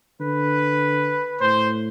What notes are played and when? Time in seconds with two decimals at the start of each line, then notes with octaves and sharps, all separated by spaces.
0.20 D3 B4
1.40 A2 C5